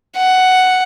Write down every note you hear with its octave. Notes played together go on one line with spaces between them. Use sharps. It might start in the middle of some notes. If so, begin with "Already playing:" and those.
F#5